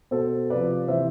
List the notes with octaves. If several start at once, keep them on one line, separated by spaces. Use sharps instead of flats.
B2 A4 C5
C3 F3 B4 D5
C3 E3 C5 E5